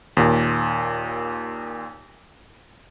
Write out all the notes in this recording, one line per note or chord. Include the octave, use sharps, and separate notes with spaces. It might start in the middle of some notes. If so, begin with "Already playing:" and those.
D#2 A#2